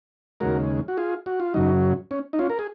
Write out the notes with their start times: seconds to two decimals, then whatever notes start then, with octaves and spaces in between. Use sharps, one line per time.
0.40 D#2 C#3 G#3 F#4 A#4
0.88 F#4
0.97 F4 G#4
1.26 F#4
1.40 F4
1.54 F#2 C#3 F#3 D#4
2.11 C#4
2.33 D#4
2.39 C#4 F4
2.50 A#4
2.59 G#4